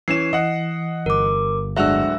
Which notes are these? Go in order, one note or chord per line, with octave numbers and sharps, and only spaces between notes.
E3 C#4 C7 E7
E3 D#5 F#5
G1 A#4 D6
D1 G#3 D4 F#4 E5 E6 F7